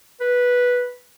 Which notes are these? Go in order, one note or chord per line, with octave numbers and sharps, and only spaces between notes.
B4